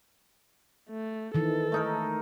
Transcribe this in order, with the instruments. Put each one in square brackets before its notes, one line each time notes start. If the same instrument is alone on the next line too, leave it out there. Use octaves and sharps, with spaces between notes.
[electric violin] A3
[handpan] D#3 E3 [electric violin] A4
[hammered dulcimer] A3 D#4 A#4